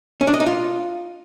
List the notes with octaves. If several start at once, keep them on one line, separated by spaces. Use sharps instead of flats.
C#4
D4
D#5
D#4
F4